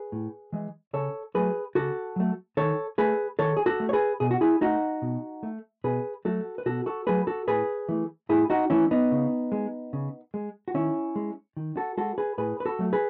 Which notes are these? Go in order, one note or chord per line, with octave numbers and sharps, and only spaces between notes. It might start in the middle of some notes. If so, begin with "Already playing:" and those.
Already playing: G#4 B4
A2
E3 G#3
C#3 A4 C#5
F#3 A3 G#4 B4
C#3 F#4 A4
F#3 A3
D#3 A4 C#5
A3 G#4 B4
D#3 A4 C#5
G#4
F#4 A4
A3
C#5
G#4 B4
B2 G#4
F#4
E4 G#4
A3 D#4 F#4
B2
A3
B2 G#4 B4
F#3 A3 F#4 A4
B4
B2 F#4 A4
F#4 A4
F#3 A3 G#4 B4
F#4 A4
A2 G#4 B4
E3 A3
A2 E4 G#4
D#4 F#4
E3 A3 C#4 E4
B3 D#4
C#3
G#3
C#3
G#3
F#4
D#3 C#4 E4
G#3
D#3
F#4 A4
G#3 F#4 A4
G#4 B4
A2 G#4 B4
B4
F#4 A4
F#3 A3
G#4 B4